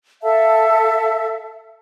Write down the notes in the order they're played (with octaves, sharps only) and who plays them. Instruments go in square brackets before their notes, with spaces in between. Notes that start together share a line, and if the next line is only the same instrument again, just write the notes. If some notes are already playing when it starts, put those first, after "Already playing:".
[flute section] A4 E5 F5 A5